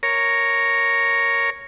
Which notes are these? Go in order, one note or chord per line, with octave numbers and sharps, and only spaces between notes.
A#4 C#5